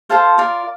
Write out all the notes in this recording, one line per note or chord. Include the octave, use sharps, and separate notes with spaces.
F4 A4 C5 F5 A5
F4 A#4 D5